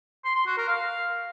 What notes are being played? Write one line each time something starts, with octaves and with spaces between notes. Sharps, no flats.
C6
C6
F#4
A#4
F5